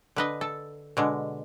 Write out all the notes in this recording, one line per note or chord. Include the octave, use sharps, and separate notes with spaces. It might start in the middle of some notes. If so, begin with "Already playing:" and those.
D3 B4 D#5
A4
B2 D3 G#3